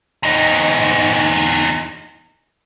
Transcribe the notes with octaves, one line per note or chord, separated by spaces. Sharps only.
E2 D#4